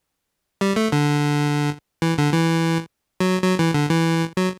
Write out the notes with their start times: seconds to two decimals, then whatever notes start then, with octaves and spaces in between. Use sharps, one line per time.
0.61 G3
0.76 A3
0.92 D3
2.02 E3
2.18 D3
2.34 E3
3.20 F#3
3.43 F#3
3.59 E3
3.74 D3
3.90 E3
4.37 F#3